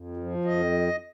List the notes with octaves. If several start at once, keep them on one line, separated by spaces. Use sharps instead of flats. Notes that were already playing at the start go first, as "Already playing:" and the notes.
Already playing: F2
F3
F2 D#5